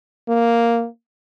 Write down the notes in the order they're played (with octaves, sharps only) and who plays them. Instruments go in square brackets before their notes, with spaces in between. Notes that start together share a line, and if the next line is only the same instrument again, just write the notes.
[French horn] A#3